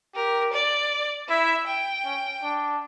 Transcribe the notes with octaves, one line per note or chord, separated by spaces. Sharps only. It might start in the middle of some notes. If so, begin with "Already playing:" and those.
G4 A#4
D5
E4 E5
G5
C#4
D4